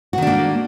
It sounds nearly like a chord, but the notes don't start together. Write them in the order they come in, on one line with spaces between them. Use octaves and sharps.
F#4 D#3 D4 A#3